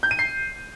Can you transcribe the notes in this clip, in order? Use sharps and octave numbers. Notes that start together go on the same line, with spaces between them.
G6
D#7
C7